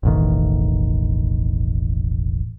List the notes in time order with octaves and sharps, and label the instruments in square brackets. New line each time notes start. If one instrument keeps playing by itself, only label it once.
[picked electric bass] E1 A1 D#3